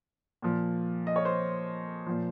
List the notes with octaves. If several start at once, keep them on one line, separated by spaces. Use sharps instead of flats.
A#2 F3
D#5
C#5
C5
A#2 F3